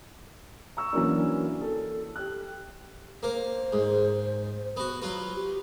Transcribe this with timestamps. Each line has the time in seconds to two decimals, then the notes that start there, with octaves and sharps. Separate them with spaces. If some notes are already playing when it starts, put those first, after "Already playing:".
0.77 A#5 C#6 E6
0.93 E3 F#3 A#3 C#4 D4
1.61 A4
2.16 G4 F#6
3.23 A#3 A#4 C5
3.35 C5
3.73 G#2
4.77 B3 F#4
5.02 F#3 F4 B4
5.35 G4